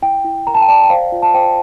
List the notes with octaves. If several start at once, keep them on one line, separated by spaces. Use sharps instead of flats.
E4 G5
E4
A#4 A#5
A5
G5
D5 A5
G5
C5 F5
F4
A5
C5 G5